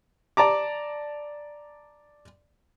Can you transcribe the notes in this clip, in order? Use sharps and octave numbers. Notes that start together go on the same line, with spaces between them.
D5 A5 A#5 D6